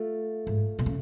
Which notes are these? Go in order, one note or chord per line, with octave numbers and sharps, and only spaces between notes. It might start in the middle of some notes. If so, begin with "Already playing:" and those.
Already playing: A3 F4
G#2
B2
C#3